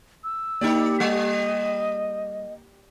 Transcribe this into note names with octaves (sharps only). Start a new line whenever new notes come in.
E6
A#3 D#4 G4 D5
G3 D#5